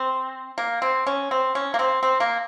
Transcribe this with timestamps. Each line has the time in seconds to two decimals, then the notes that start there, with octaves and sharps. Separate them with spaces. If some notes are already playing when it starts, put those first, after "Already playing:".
Already playing: C4
0.58 A#3
0.82 C4
1.07 C#4
1.31 C4
1.55 C#4
1.74 A#3
1.79 C4
2.03 C4
2.20 A#3